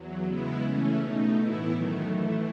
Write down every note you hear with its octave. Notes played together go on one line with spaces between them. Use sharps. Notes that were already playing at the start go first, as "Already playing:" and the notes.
Already playing: E2 F#3
C#3 G#3 B3 E4
C#3 E3 A3 C#4
B2 A3 D#4
A2 E3 B3 E4
F#2 D#3 F#3 A3
A2 E3 A3